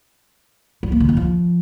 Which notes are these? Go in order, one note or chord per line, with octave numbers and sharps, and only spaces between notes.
G3
A#3
D3
D#3
F3